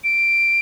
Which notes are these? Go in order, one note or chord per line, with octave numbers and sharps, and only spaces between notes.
D7